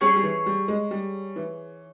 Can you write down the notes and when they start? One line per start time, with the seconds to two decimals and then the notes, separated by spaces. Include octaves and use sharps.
0.01 G3 C#4 G#4 C#5
0.16 G3
0.23 E3
0.46 G3
0.68 G#3
0.91 G3
1.36 E3